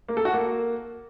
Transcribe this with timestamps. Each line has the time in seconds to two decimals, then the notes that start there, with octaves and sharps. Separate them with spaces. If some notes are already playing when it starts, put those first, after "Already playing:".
0.08 A#3
0.17 A4
0.25 F#4
0.33 A#3